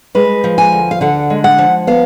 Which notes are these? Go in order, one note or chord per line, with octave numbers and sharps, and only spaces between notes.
G#3 B4
F3
G#5
D2
F5
D3 F#5
G#3
F#5
F3
B3 F5